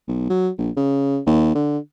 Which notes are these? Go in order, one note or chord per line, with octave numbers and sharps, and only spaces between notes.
B1
F#3
A#1
C#3
D#2
D3